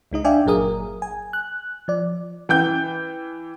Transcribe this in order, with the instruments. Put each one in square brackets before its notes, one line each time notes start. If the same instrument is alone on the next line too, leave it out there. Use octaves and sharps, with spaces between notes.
[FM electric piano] C#2 G#3 D#4 D#5
D4 D5 E5 F5 G5 G#5
G1 A#2 F#3 G#4 A#4 D#6
G#5
F#6
F3 D5
[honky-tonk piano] E3 G5 G6